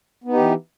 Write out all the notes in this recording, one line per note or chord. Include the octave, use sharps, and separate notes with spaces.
E3 B3 D#4 G4